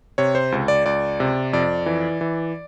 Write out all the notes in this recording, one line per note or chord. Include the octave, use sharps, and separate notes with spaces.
C3 C#5
C5
C#2
D5
C#2 D5
C3
F2 D5
E3
E3